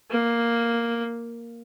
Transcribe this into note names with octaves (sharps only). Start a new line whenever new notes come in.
A#3